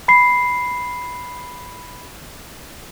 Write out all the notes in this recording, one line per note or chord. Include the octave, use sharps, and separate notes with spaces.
B5 C7